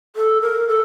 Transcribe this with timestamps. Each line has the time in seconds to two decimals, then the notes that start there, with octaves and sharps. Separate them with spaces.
0.16 A4
0.42 A#4
0.68 A4